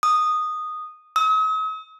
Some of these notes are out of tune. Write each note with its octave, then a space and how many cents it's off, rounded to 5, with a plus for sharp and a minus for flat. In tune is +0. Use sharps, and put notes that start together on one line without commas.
D#6 -10
D#6 +45